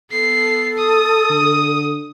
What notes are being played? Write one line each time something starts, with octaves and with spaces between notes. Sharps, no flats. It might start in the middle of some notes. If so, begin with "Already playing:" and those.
B3 A4 C7
D#6
D3